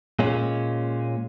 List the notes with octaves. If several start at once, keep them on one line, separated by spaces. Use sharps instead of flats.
A#2 G#3 C#4